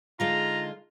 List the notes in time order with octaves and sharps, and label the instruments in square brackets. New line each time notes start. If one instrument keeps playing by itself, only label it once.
[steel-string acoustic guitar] D3 G#3 D#4 [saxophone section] F4 [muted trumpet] A#5